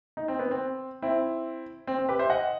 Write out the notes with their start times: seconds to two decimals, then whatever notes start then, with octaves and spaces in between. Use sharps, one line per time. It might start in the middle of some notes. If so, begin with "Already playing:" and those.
0.17 D#4
0.28 C4
0.39 B3
0.51 C4
1.02 C4 E4
1.87 C4
1.98 C4
2.09 G4 B4
2.19 C5 E5
2.30 D#5 F#5